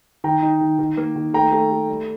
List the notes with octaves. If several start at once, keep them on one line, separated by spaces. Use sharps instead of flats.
D#3 G5 A#5
D#4
D#3
D#3
A#3
D#3
A3 G5 A#5
A3
A3
G3